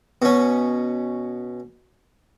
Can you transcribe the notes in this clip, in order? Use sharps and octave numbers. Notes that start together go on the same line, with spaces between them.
B2 C#4